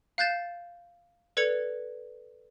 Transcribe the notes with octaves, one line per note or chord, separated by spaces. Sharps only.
F5 F#6 G6 A6 E7
A4 B4 D5 G#6 C#7 F7